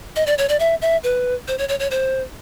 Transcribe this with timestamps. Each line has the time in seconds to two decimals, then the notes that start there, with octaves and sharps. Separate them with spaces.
0.16 D#5
0.27 D5
0.38 C#5
0.49 D5
0.60 E5
0.82 E5
1.03 B4
1.48 C5
1.58 C#5
1.69 C#5
1.80 C#5
1.91 C5